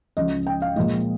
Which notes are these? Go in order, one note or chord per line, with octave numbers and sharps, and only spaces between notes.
C#2 C#3 F3 D#5
G5
F5
A#2 F3 G#3 D#5